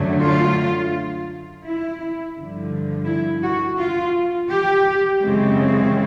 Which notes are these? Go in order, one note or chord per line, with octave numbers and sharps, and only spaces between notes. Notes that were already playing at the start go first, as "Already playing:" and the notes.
Already playing: F#2 D3 F#3 A3
F4
E4
G2 D3 F3
E4
F#4
F4
G4
F#2 C#3 E3 G#3 C4